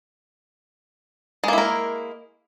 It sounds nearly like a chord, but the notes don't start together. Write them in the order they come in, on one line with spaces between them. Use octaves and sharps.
G#3 A#3 E4 A#4